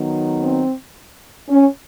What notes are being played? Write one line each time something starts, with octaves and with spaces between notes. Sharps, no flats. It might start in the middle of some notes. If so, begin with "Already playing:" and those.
Already playing: D#3 F#3 B3
C4
C#4